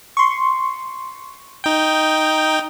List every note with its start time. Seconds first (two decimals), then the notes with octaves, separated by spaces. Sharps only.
0.17 C6 C#6
1.64 D#4 G5